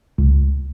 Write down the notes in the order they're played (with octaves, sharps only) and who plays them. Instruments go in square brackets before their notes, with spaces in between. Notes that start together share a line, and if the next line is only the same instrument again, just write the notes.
[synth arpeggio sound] C#2